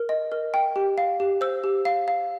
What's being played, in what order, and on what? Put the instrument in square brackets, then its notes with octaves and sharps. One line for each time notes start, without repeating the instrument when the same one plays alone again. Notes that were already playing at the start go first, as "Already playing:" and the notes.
Already playing: [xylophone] A#4
D#5
A#4
G5
G4
F5
G4
C5 E6
G4
F5
F5